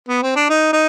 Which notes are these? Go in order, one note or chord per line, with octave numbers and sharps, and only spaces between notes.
B3
C4
D4
D#4
D#4